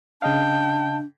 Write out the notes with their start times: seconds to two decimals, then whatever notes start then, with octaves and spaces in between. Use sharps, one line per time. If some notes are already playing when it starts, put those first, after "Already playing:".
0.22 C#3 D4 D#5 F5 G5 A5